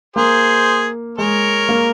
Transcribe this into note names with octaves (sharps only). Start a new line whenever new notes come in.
A#3 G#4 C5
G#3 A#4 C#5
A#3